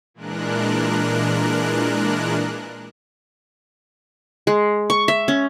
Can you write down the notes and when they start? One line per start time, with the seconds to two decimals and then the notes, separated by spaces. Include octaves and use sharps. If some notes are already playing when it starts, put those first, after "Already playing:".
0.14 A#2 E3 G#3 D4 A#4 F#6
4.47 G#3
4.90 C#6
5.08 E5
5.28 C#4